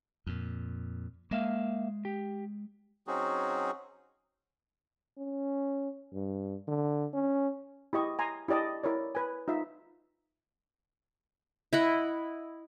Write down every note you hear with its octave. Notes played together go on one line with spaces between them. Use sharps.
F2 A#2
G#3 A#3 E5 F5
G4
F#3 C4 C#4 D#4 F#4 G#4
C#4
G2
D3
C#4
E4 G4 D#5 C#6
G#5 A#5 C6
E4 G4 D5 D#5 A5
E4 A#4 C#5 D5
B4 G#5
D#4 F4 E5
E4 D#5 F#5